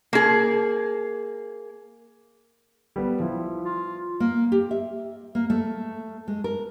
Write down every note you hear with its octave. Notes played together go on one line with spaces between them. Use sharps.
A#3 G#4
G3 B3
F3 E4
F4
A#3
G4
E5
A#3
A3
G#3
A#4